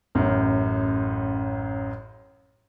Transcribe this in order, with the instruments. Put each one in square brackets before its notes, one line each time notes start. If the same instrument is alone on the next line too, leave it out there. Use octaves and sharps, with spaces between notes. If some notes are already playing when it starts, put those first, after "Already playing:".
[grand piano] A1 F#2